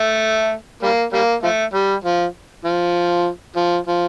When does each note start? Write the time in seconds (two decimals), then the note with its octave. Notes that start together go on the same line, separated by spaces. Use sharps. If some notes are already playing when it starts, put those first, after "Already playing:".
Already playing: A3
0.83 G3 A#3
1.13 G3 A#3
1.43 F3 A3
1.73 G3
2.04 F3
2.65 F3
3.56 F3
3.86 F3